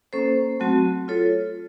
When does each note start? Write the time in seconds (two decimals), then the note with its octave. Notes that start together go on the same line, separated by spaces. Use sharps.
0.13 A#3 C#4 A4 C5
0.60 F#3 A3 C4 F#4
1.08 F4 A4 C#5